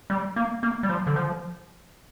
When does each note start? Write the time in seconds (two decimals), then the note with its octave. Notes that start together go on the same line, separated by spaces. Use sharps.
0.10 G3
0.36 A#3
0.63 A#3
0.83 G3
0.89 F3
1.07 D3
1.16 F3